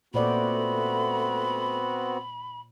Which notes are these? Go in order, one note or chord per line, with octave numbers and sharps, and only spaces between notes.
A#2 A3 B3 C4 F#4 C5 D5 B5